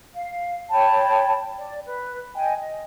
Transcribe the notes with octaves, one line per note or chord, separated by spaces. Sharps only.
F5
C#5 G5 A5 B5
D5
B4
D#5 G5 G#5
D#5